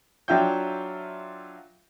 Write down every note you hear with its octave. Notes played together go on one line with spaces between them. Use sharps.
F#3 D4 F4 E5 G5 G6